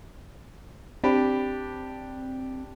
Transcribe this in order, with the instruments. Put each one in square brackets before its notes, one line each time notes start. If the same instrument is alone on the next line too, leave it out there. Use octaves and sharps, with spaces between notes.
[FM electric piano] C4 [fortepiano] D4 G4 B5